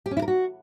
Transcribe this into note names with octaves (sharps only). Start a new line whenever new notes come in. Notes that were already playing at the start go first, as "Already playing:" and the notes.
G4
C#4
E4
A#4
F#4